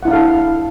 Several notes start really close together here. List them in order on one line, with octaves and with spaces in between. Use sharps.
F#5 E4 D4 F5 A4